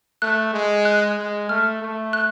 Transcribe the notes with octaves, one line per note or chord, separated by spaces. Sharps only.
A3 F#6
G#3
F#6
G#3
A3 F6
A3
F#6